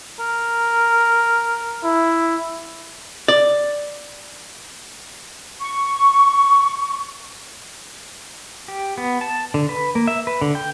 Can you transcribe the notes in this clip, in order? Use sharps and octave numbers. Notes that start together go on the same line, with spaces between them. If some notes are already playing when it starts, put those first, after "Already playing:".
A#4
E4
D5
C#6
G4
B3
A5
D3
B4
A#3
E5
B4
D3
G5